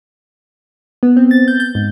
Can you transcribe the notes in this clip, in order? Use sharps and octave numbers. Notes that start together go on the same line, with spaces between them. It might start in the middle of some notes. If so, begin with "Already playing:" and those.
B3
C4
A6
G6
G6
G#2